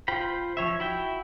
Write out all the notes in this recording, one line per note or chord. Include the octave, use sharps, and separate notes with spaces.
F4 C5 G5 B5
F3 C#5 E5
E4 F#4 E5 G5